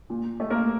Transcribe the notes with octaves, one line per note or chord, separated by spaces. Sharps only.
A#2
A3
A#3 A#4